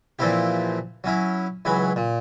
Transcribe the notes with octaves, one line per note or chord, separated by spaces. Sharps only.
A#2 E3 F3 C4 E4 G4
F#3 C#4 E4
C#2 E3 F#3 G#5 B5
A#2